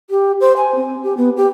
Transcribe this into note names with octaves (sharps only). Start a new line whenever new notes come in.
G4
C5
G#5
C4
G4
B3
G4